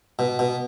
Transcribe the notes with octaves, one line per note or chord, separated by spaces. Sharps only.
B2
B2